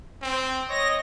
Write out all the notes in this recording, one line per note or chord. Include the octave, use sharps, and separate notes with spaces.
C4
C#5 D#5 A#6